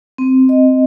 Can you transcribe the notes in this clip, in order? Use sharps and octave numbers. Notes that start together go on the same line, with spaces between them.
C4
D#5